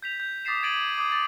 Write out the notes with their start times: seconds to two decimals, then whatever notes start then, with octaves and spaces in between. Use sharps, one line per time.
0.03 G6 B6 F7
0.20 G6
0.45 D6 D#6 A6 B6 C7 E7
0.63 G#6 A6 D7 D#7 F#7
0.98 D6 D#6 G6 F#7
1.11 D6 A6